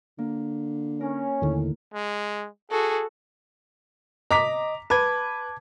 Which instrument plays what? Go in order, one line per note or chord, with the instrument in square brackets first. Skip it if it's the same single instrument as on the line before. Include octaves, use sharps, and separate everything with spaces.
[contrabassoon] D3 [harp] A#3
[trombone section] C#4 [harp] A#4
[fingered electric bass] D#2 D3 D#3 [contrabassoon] A2
[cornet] G#3
[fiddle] F#4 A4 [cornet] G#4
[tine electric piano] D#5 [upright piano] A#5 D6 B6
[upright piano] B4 [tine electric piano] A5 D6 G#6